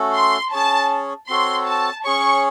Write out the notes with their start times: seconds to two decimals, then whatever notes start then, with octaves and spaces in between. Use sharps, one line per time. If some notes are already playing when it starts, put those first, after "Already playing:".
Already playing: A3 C#4 F#4 A4
0.15 C6
0.52 C#4 G#4 C#5 A5
1.28 C4 F#4 A4 C#5 C6
1.67 A5
2.04 C#4 G#4 C#5 C#6